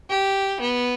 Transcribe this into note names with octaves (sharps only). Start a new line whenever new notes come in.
G4
B3